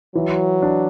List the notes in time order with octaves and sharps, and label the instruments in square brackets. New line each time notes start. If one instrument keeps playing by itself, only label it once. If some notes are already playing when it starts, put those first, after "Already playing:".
[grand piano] E3 [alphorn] F#3
[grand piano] D4